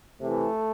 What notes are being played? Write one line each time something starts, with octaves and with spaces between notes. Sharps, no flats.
C3 E3 A3